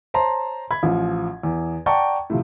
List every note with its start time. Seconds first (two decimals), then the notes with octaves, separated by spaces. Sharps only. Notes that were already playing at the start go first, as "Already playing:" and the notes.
0.14 C5 C#5 A5 A#5 C6
0.71 B5 G#6
0.83 A1 F3
1.43 E2
1.86 D5 F#5 G5 A5 A#5 C#6
2.30 A2 C3 F3